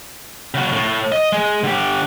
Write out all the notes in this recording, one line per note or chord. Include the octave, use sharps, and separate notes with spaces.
C#3 F#4
A2
D#5
G#3
D3 G4